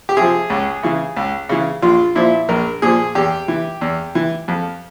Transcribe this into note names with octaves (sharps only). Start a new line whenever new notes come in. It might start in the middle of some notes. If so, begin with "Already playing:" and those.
G4
C3 F3 G#4
C#2
C#3 E3
C#2
C#3 E3
A#1 F4
A#2 F3 E4
A#1 A#4
A#2 F3 G#4
E2 G4
E3
E2
E3
F2